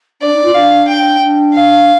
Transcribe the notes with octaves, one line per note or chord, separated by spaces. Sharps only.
D4 D5
D#4
F4
D4 F5
G5
D4
F5